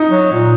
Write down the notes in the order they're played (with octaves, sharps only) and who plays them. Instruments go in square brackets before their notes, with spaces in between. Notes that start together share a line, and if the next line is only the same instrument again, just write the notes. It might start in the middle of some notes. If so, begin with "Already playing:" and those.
Already playing: [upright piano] D#4
[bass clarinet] F#3
A#2